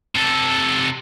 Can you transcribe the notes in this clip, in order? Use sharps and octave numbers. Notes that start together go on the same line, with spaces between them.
C3 A4